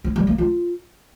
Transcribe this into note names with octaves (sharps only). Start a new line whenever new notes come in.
E4
G3
A#3
F4